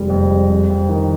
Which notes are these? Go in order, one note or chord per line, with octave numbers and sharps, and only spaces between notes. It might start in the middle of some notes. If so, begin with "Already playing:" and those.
Already playing: F1 G3 G#3
F2
G3
F2
F2
D#3